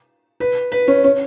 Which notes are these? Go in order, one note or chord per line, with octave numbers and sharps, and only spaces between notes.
B4
B4
C#4
C#4